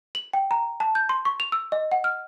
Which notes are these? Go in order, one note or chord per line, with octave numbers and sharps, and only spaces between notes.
F#7
G5
A#5
A5
G6
C6
C#6
F7
E6
D#5
F#5
F6